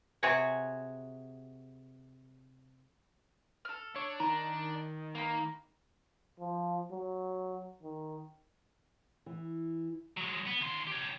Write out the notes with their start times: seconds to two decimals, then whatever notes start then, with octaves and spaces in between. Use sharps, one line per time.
0.23 C3 F#4 G#4 C#5
3.65 A4 F6
3.96 D4 C#5
4.20 D#3 A#5
5.15 A#3 A#5 B5
6.40 F3
6.92 F#3
7.83 D#3
9.26 E3
10.17 F#3 G#3
10.46 B3
10.61 D#2 C6
10.87 G4 C#5